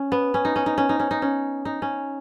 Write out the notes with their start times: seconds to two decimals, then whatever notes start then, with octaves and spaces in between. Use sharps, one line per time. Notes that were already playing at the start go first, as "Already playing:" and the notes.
Already playing: C#4
0.12 B3
0.34 C#4
0.45 D#4
0.56 C#4
0.66 D#4
0.78 C#4
0.89 D#4
1.00 C#4
1.11 D#4
1.22 C#4
1.65 D#4
1.82 C#4